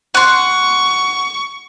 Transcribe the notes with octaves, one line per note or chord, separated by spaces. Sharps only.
F#5 C6 C#6